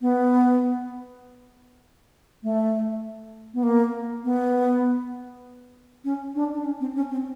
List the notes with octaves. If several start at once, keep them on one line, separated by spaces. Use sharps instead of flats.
B3
A3
B3
A#3
B3
C#4
D4
D4
C#4
C4
C#4
C4